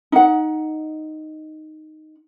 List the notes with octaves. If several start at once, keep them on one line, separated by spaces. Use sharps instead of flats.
D#4 F#5